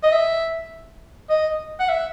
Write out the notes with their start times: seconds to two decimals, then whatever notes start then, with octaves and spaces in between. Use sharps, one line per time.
0.03 D#5
0.12 E5
1.29 D#5
1.79 F#5
1.89 E5